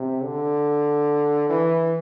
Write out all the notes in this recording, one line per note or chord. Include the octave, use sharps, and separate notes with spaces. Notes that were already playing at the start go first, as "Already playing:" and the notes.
Already playing: C3
D3
E3